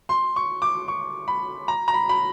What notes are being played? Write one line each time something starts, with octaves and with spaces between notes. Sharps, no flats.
C6
C#6
D6
C#6
B5
A#5
A#5
B5
B5